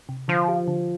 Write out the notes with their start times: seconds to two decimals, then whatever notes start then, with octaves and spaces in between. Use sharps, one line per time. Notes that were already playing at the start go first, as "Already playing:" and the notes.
0.09 C3
0.28 D3 F3
0.48 G4
0.68 D3